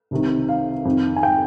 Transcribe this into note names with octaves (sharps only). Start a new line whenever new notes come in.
C2 C3 D#3
F5
F2 D#3
G#5
G5